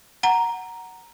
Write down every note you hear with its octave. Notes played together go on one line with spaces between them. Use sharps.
F#5 A#5